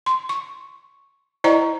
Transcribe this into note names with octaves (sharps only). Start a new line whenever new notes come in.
C6
C#6
E4 C5 D5 D#5 G5 A#5